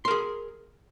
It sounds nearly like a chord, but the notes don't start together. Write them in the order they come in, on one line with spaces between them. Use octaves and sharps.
C6 A#4 G#4